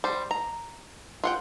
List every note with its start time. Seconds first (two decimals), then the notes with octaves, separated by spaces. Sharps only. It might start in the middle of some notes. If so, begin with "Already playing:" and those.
0.04 G3 C5
0.31 A#5
1.24 F4 F#5 G5